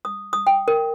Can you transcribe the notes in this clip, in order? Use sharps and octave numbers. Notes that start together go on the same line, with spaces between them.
D#6
D#6
G5
A#4